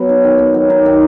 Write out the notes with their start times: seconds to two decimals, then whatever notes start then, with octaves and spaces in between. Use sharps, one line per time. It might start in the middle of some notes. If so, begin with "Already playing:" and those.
Already playing: F#3 B3
0.09 D#4
0.24 D#3
0.39 B3
0.54 F#3
0.70 D#4
0.86 D#3